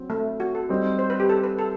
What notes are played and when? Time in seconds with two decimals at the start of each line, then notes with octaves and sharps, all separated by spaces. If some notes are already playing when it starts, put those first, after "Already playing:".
Already playing: F#3 C4
0.10 A3
0.40 F#4
0.55 A4
0.69 G3 C4 D#4
0.99 C5
1.10 B4
1.20 G4
1.29 A4
1.44 B4
1.58 A4